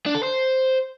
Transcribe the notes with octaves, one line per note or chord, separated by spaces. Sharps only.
D4
A4
C5